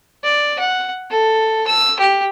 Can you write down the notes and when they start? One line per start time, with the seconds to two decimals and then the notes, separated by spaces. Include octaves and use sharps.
0.24 D5
0.59 F#5
1.11 A4
1.67 E6
2.00 G4